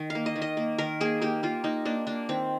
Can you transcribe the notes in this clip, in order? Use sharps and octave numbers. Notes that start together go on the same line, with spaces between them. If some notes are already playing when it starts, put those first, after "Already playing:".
Already playing: D#3
F5
A#3
D#5
D#3
D#5
A#3
D#3 A#4
A#3 G#4
A#3 G4
A#3 F4
A#3 D#4
A#3 D4
A#3 D4
D#3 C4